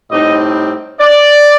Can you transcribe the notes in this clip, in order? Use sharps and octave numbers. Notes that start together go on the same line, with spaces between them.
A2 G3 C4 D#4 D#5
D5